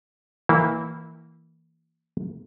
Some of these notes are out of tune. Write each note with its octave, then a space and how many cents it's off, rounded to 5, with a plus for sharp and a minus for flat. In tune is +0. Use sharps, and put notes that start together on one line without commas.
E3 -15 A#3 -20 E4 -20